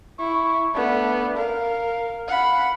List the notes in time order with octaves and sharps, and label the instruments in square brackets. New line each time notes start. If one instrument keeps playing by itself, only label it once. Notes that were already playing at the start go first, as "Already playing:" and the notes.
[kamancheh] E4 [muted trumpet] C#6
[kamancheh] A3 B3 [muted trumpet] D4
[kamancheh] A#4 [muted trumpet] F5
[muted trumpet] F5 [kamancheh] F#5 B5